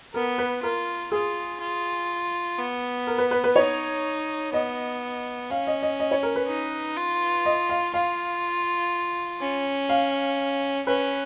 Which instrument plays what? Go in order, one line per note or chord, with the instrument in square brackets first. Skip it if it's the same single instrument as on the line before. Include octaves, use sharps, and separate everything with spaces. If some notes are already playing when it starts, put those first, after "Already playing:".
[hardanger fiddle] B3 [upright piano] A#4
[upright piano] B4
[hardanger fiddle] F4 [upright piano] A#4
[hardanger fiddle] F4 [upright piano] G#4
[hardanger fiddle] F4
B3
[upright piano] A#4
B4
B4
B4
[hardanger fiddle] D#4 [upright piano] C#5
[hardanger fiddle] B3 [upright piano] D#5
[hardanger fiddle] C#4 [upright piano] F5
[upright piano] D#5
D#5
D#5
C#5
A#4
B4
[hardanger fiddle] D#4
F4
[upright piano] D#5
F5
[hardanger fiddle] F4 [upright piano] F5
[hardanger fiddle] C#4
[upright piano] F5
[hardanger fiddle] C#4 [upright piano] B4